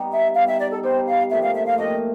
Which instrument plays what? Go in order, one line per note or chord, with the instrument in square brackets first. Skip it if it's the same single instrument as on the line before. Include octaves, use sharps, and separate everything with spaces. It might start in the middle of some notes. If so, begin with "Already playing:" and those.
Already playing: [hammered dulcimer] G3 B3 D#4
[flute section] E5
[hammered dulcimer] G3 B3 D#4 [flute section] F5
[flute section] E5
D5
A4
[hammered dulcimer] G3 B3 D#4 [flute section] C5
[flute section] F5
[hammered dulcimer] A#2 F3 A3 C4 [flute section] E5
[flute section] F5
E5
F5
[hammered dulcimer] A#2 F3 A3 C4 [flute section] D#5